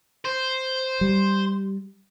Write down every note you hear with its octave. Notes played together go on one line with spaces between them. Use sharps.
C5
G3